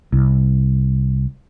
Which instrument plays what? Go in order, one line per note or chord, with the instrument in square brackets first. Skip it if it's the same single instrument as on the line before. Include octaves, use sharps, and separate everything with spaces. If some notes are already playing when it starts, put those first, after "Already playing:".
[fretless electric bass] C2